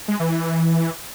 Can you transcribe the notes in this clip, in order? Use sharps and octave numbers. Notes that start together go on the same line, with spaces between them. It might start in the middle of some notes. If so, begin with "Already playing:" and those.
G#3
E3
E3